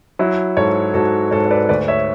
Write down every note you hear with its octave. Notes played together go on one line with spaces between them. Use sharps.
F#3 E4
G#2 A4 C#5
G#2 F#4 A4
G#2 A4 C#5
C#5
B4 D5
D2 B4 D5
C#5 E5